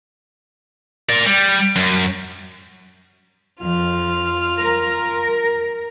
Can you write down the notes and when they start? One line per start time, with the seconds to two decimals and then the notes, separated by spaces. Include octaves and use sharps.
1.09 A#4 D5
1.26 G3
1.76 F#2
3.61 F2 F4 F6
4.59 A#4